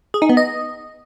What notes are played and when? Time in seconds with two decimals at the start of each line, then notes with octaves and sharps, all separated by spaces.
0.14 G#4
0.22 D#4
0.29 B3
0.37 D#5